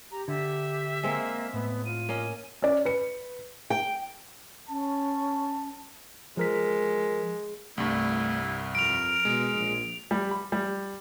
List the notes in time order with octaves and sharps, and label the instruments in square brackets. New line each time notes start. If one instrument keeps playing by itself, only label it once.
[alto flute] G4 [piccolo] A#5
[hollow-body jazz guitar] D3 [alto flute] G4 [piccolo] E5
[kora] G#3 C4 [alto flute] A#3
[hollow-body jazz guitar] A2 [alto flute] B3
[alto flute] F4 [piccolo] D#7
[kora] A#3 C#4 D#5
[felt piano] C#4 D5
B4 C#7
[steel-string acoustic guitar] G5
[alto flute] C#4 [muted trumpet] A5
[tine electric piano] F3 A#4 B6 [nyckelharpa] G#3
[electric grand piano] C2 G2 [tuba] A3 [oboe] E4
[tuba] F2 [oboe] A#4 [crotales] D7 F7
[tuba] B2 [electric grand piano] G#3
[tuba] A#1
[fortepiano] G3
B5
G3